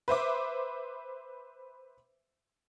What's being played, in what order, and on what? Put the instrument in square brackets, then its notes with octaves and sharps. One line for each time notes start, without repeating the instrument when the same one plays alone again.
[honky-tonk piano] B4 C5 E5 D6